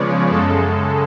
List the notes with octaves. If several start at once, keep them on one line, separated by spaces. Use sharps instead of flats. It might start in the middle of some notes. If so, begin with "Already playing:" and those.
Already playing: C#3 F3 G#3 B3 C#5 D5
F#2 C#3 G#3 A4